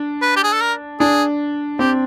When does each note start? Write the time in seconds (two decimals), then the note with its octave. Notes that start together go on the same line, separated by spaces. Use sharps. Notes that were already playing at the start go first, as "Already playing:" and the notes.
Already playing: D4
0.22 B4
0.36 G4
0.44 G#4
0.53 A4
0.61 A#4
1.00 D4 G#4
1.79 C4 G4